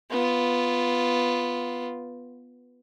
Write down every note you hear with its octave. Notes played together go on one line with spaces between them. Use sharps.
B3 F4